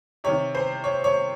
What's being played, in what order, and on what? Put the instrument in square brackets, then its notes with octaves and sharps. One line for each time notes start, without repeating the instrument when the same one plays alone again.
[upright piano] C3 D#3 C#5
C5
C#5
C#5